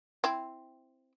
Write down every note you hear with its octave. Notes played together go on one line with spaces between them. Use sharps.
C4 E4